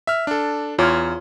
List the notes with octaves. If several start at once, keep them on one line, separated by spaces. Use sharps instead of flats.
E5 F6
D4 A4
E2 F4 C#5 D6 F6